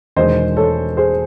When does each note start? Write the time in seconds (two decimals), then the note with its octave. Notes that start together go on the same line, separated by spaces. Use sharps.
0.16 E1 E2 D#3 G#3 C5 D#5
0.57 A4 C#5
0.97 G#4 C5